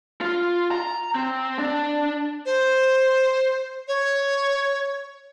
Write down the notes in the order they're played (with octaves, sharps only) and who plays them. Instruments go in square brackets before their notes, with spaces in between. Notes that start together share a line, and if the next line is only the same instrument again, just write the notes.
[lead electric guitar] F4
A#5
C4
D4
[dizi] C5
C#5